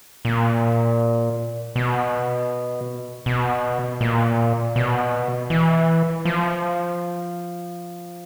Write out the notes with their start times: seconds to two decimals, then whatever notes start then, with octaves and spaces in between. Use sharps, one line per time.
0.25 A#2
1.76 B2
3.26 B2
4.01 A#2
4.76 B2
5.50 E3
6.25 F3